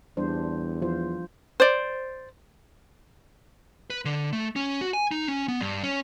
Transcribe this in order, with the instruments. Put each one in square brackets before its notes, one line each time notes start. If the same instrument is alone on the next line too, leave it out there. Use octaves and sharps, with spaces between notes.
[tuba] E2 [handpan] G3 D4 C5
[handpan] F3 F4 C5
[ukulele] C5 D5
[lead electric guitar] B4
D3
A3
C#4
F#4
G#5
D#4
C#4
B3
G2
C#4